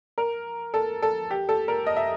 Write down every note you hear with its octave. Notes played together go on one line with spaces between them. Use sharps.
A#4
A4
A4
G4
A4
A#4
D#5
E5